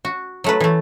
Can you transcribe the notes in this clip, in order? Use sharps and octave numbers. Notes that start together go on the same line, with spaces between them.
F#4
F#3 A3 B4
E3 A3